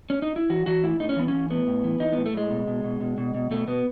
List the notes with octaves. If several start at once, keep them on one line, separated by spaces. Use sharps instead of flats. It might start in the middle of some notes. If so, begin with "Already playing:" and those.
C#4
D#4
E4
E3 F#4
E3 F#4
A2 E4
A2 D#4
C#4
E3 B3
C#4
E3
A2 B3
A2
E3
E3 D#4
B3
A2
A3
A2 G#3
B2
B2
B2
B2
B2
B2
B2 A3
B2 B3